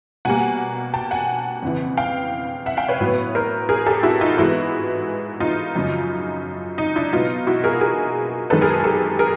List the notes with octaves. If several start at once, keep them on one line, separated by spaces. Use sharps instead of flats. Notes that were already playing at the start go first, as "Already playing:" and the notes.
B2 G3 A#3 F#5 G#5
G5 A5
F#5 G#5
F2 C#3 E3
F5 G5
E5 F#5
F5 G5
B4 C#5
A2 F#3 B3
A#4 C5
G#4 A#4
G4 A4
E4 F#4
D#4 F4
G#2 E3 G#3 B3 E4 F#4
D#4 F4
F#2 C#3 F3
D#4
D4 E4
B2 F#3 B3 D#4 F4
E4 F#4
G#4 A#4
G#4 A#4
F#2 D#3 G#3 B3 A4 B4
G#4 A#4
A#4
G4 A4
G#4 A#4